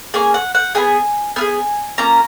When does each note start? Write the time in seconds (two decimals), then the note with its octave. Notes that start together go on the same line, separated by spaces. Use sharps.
0.14 A#3 C#4 G#4 G#5
0.34 F#5
0.55 F#5
0.75 B3 D#4 G#4 G#5
1.36 B3 F4 G#5
1.41 G#4
1.98 A#3 C#4 F4 A#5